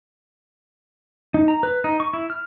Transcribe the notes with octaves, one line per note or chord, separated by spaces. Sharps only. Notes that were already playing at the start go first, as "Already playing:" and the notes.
D#4
A#5
B4
D#4
C#6
E4
F6